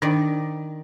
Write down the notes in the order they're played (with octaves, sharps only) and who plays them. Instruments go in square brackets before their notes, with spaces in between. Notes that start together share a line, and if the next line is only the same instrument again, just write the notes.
[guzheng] D#3 D5 [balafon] D4